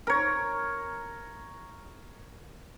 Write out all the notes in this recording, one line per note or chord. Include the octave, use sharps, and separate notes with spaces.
A#4 C#5